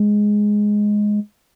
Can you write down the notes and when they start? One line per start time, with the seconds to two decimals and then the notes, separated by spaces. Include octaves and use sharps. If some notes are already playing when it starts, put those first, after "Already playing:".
Already playing: G#3